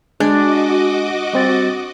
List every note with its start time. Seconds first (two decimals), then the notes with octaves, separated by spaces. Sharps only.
0.20 G#3 D4 F#4 D#5 G#5 D6
1.33 G3 C4 A6